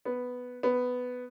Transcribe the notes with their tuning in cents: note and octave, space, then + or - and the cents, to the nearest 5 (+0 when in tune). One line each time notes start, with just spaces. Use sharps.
B3 +5
B3 +10